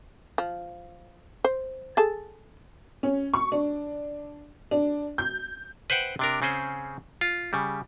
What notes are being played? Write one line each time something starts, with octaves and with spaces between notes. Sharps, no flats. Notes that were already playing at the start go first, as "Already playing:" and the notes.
F3
C5
G#4 A4 A5
C#4
C#6
D4
D4
G6
B4 C5 E5 F#5 G5
C3 D4 A#4
C#3 C4 C#4 G#4 C5
F4
C#3 G3